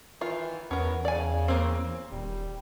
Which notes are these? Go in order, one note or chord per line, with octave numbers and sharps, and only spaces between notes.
D#3 E3 F4
E2 B3 C#4 A#4
C#3 D5 G#5
A#3 C4
D#1 G3